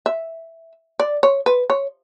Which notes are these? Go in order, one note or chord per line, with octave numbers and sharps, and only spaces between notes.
E5
D5
C#5
B4
C#5